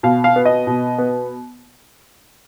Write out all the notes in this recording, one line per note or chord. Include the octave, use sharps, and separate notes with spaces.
B2 F5
F5
B3
D#5
B2
B3